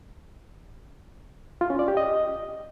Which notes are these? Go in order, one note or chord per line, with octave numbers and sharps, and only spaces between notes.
F4
C#4
D5
G4
D#5